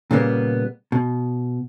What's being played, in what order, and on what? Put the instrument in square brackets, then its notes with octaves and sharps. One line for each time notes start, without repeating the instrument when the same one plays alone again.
[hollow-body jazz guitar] A#2 C#3 G3 A#3 B3
B2